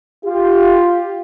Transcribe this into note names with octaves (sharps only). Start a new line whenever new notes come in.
F4 G4